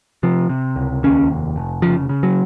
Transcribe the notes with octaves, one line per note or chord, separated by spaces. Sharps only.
C3 F3
C3
C#2
D#2 C#4
F1
F1
C#3 F3
C#3
F#3